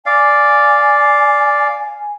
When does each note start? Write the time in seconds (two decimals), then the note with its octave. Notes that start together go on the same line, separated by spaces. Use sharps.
0.06 D5 F5 G#5